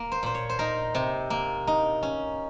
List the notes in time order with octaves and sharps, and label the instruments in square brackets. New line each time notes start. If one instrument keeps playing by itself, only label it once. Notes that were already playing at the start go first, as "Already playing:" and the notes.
Already playing: [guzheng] A#3
C5
A#2 C5
C#5
C5
D#4 A#4
C3
A#3
D#4
C#4